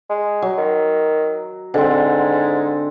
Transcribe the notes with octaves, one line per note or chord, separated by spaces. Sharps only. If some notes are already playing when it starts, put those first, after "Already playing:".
G#3
F#3
D#3
G#2 D3 C4